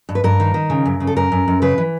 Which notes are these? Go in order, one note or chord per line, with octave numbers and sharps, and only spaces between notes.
G2
B4
G2 A#4
D#3
D#3
C#3
F#2
C#3
A4
F#2 A#4
F#2
F#2
C#3 B4
E3